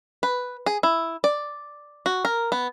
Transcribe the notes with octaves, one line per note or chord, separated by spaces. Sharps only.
B4
G#4
E4
D5
F#4
A#4
B3